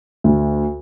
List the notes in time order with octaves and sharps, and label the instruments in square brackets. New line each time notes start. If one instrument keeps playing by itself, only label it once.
[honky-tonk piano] D2